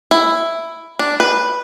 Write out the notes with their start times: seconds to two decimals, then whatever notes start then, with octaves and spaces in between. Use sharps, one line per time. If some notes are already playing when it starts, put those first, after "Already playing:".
0.11 E4
0.99 D4
1.20 B4